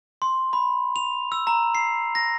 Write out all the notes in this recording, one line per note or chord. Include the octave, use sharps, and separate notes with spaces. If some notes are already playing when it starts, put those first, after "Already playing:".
C6
B5
F7
E6
A#5
C7
A#6